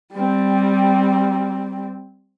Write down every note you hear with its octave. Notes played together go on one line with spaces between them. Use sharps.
G3 C4